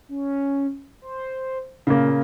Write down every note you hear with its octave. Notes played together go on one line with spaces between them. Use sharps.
C#4
C5
A#2 C#3 A#3